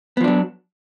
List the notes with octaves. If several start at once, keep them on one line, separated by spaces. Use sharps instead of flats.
F3 F#3 B3 D4